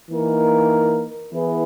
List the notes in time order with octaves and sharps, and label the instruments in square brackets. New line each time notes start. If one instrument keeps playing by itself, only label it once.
[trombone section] E3 A#3 D#4 A#4
E3 B3 E4 G#4 B4